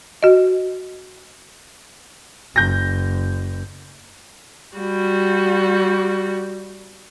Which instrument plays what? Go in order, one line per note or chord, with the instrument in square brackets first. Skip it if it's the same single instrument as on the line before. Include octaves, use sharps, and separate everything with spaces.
[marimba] F#4 D#5
[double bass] F#1 [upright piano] G6 A#6
[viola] G3 F#4